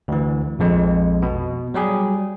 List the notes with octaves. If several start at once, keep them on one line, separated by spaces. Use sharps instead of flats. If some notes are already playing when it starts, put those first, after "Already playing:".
D2 E3
A#1 F2 G#3
B2
F#3 G3 G4 G#4